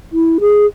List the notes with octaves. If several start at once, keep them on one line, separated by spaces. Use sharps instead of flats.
E4
G#4